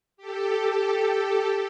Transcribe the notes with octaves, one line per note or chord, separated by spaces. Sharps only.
G4 A4